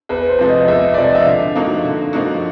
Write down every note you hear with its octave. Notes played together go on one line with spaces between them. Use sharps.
E2 B4
C5
C3 F3 G#3
D#5
E2 E5
C3 F3 G#3 D5
D#5
E5
D3 F5
F3 A#3 D#4 F#4
D3
F3 A#3 D#4 F#4